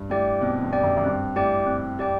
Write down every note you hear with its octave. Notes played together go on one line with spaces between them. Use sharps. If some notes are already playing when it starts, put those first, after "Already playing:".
Already playing: G2
A2 G4 D5 G5
B2 C4
G2
G4 D5 G5
F#2
F#2
G2 C4
A2 G4 D5 G5
C4
G4 D5 G5